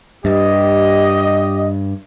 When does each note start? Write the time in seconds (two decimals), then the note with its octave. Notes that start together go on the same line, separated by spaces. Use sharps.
0.25 G2 G4 D#5